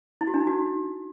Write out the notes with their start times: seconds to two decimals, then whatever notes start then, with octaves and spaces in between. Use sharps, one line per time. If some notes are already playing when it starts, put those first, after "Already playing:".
0.21 E4
0.27 F#4
0.34 D4
0.40 D#4
0.47 F#4